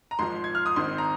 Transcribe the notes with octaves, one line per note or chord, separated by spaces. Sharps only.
A#5
G#1 G#2 F3 C6
G#6
F6
D#6
G#1 G#2 D#3 C4 C6
A#5